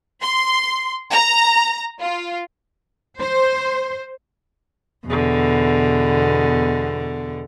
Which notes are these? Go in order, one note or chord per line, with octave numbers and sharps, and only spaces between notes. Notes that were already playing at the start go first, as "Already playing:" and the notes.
C6
A#5
F4
C5
E2 B2 D3